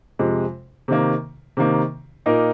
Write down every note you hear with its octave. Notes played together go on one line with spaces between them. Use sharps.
F2 C3 G#3
C3 D#3 A#3
C3 D#3 A#3
A#2 A#3 D#4 A#4